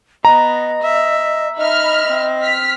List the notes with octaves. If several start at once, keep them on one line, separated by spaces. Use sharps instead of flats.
B3 D#5 A#5
E5
D#4 D#5 E5 B5 F6
C4
F6 B6